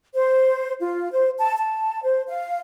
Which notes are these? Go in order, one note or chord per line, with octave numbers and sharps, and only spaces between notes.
C5
F4
C5
A5
A5
C5
F5